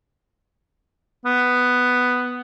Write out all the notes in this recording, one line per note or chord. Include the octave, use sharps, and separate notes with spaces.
B3